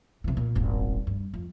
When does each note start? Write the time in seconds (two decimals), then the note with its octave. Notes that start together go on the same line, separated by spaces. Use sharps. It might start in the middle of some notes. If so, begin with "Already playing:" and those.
0.24 C3 E3
0.37 A#2
0.55 D#1 G#1
1.07 G2
1.34 F2